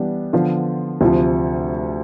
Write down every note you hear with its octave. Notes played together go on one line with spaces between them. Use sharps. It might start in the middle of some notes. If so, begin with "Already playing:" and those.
Already playing: E3 G3 B3 D4
D3 F3 B3 F4
D2 C3 F3